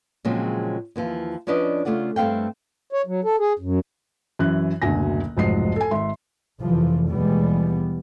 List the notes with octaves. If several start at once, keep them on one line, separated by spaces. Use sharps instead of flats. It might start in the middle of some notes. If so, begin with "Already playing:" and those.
A#2 C#3 F3 F#3 G#3 C4
D#2 E3 F3
F3 C#4 D4 B4 D5 D#5
C#3 A3 F4 D5 F#5
G2 A3 C4 F5 G5
C#5
F#3
A4
G#4
F#2
F#2 E3 F#6
F#1 D2 B2 G#5 A#6
F1 B1 G#2 F3 D#5 C7
A4 G#5
G#1 E5 C6
F1 E3 F3
D#2 B2 E3 G3 G#3 B3